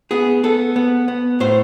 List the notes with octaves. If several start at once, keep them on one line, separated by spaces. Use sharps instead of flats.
B3 G#4
B3 A4
B3
B3
A2 C5